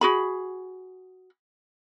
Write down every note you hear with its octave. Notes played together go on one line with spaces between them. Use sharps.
F#4 G#4 B5